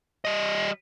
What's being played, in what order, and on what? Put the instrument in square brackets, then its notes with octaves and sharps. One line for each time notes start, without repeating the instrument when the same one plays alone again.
[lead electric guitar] G3 D#5